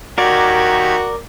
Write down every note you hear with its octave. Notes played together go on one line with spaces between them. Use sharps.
D#2 F#4 G4 A#4 D5 G#6